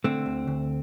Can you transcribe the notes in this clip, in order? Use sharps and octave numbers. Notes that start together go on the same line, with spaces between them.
D3 A3 C4
D2
D2